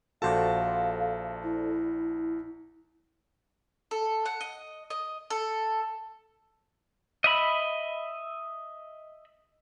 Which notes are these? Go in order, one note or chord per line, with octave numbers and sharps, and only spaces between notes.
A#1 F#4 A4 C5 D5 F5 A5
E4
A4
F#5
D#5
D#5
A4
D#5 E5 B5